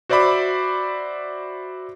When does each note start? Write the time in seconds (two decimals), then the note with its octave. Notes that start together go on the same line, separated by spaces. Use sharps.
0.10 F#4 C5 D5 E5 B5 D6